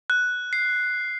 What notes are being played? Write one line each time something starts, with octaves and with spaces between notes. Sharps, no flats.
F#6
C7